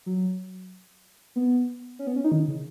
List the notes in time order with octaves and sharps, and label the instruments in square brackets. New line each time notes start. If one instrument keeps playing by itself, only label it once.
[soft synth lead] F#3
B3
C#4
B3
C#4
D#4
D#3
C#3